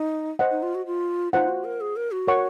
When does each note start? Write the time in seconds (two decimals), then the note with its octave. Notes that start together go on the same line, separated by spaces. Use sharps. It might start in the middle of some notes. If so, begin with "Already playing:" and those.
Already playing: D#4
0.39 C5 D#5 F#5
0.51 D#4
0.63 F4
0.75 F#4
0.86 F4
1.33 D#4 F4 C5 F#5
1.48 F#4
1.64 A#4
1.81 G#4
1.96 A#4
2.12 F#4
2.27 A#4 C#5 F#5 C#6